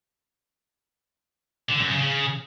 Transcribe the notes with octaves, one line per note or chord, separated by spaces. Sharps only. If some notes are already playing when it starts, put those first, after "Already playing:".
D3
F#2
C#3
C#3